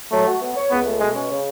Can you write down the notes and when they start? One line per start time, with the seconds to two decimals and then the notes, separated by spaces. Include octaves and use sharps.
0.12 F#3 A3
0.27 F#4
0.42 B3
0.56 C#5
0.71 C#2 B3
0.86 A3
1.00 B2 G#3
1.15 C#4
1.30 C#3